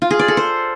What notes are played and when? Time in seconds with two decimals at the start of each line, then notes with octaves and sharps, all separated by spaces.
0.02 F4
0.11 G#4
0.19 D5
0.28 A4
0.37 C5